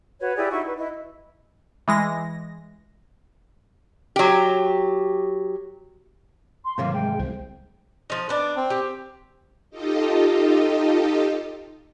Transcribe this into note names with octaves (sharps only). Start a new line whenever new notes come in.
F#4 B4 C#5
E4 G4 G#4 D5
D#4 E4 F#4 C#6
B4
E4 D#5
E3 G#3 A#6
F#3 G4
C6
G#2 C3 D#3 E3 F#3 A#3 F5
G#3 G5
C2 C5
F3 D#4
B3 D4 D5
C4
G4
D#4 F4 G4 A4 D#5